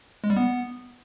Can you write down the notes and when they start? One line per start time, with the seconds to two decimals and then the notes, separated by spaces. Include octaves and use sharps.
0.24 G#3
0.30 G3
0.36 B3